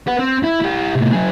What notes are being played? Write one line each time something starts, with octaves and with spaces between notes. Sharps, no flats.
B4 F#5
C4
E4
E4 G4
A2 C3
F#2 G#4